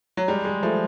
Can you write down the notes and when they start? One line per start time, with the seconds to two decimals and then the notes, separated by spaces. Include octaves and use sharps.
0.17 F#3
0.28 G3 G#3
0.45 G#3
0.63 F3 A3